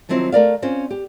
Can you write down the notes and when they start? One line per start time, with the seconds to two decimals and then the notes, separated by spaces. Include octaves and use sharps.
0.09 D#3 F3 F#3 C4 E4
0.32 A3 A#4 D5 F5
0.62 C4 C#4 F4
0.91 G4